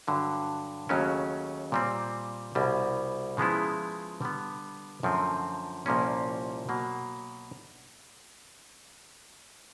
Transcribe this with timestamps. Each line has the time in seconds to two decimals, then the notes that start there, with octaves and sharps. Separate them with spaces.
0.07 G2 D3 F#3
0.89 D#2 C#3 F#3 A3 C#4
1.72 A#2 G3 C4
2.55 C2 B2 G3
3.37 C#3 F3 G#3 B3 E4
4.21 D3 G3 B3
5.03 F#2 D3 F3 A3 C4
5.86 C2 A#2 F3 A#3 C#4
6.69 B2 F#3 A#3